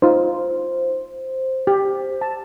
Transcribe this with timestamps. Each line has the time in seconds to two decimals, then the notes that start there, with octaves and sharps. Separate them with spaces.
0.02 D#4 F4 C5
1.67 G4
2.21 A5